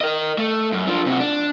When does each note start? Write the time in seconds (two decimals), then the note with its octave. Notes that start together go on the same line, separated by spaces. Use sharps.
0.01 A#4 D#5
0.38 A3
0.72 F#2
0.87 F3 D4
1.06 C3 F#4
1.20 D4